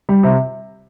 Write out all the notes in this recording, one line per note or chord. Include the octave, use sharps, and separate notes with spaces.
G3
C3